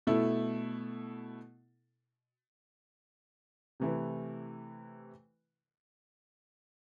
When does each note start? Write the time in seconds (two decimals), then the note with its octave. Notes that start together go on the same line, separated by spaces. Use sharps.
0.07 B2 A3 E4 A4
3.80 C3 E3 A3 E4 B4